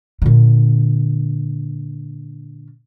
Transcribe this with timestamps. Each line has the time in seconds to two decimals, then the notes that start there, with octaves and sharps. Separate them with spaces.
0.22 A#2 D3